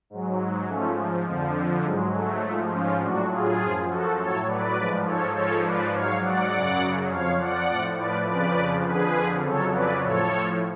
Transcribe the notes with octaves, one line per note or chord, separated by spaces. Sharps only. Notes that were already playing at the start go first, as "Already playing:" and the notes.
G#2 F#3
G#2 F3 A3 C#4
F2 D3 F3
G#2 F#3 G#3
A3
G#2 F3
C#4 F4
A2 F#3 D4 F#4
F4 G#4
F#2 F3
F#4 A4
A2 F#3 A4 C#5
B4 D5
G#2 F3
A4 C#5
G#2 F3 A4 C#5
B4 D5
G#2 F#3 C#5 F5
D5 F#5
F#2 C#3 F#3
F2 F3 C#5 F5
D5 F#5
A2 F3
B4 D5
F2 C#3 F3 B4 D5
F2 D3 F3 G#4 B4
F2 C#3 F#3 A4 C#5
B4 D5
A2 F3 A4 C#5